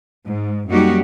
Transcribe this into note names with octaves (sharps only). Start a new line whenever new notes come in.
G#2
F#2 G3 A#3 D#4 F#4 G4